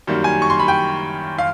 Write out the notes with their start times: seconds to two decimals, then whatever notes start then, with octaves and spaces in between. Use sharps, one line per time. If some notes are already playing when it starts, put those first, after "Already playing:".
0.07 F#2 D#3 G3 A#3
0.24 G#5
0.42 C#6
0.50 C6
0.60 B5
0.68 G5
1.39 F5